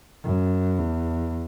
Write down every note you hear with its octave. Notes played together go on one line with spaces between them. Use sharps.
F#2
E2